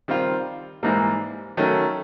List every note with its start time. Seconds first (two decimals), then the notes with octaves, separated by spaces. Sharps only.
0.08 D#3 G3 C4 F4
0.83 G#2 E3 G3 A#3
1.57 D#3 F#3 A3 C#4